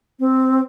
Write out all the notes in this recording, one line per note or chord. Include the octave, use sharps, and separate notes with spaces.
C4